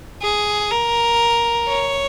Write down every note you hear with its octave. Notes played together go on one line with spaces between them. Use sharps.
G#4
A#4
C#5